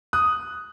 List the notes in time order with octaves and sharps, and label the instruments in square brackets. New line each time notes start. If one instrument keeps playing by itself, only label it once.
[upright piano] D#6 F#6